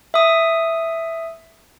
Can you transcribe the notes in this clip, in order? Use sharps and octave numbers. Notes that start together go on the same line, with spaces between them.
E5 D#6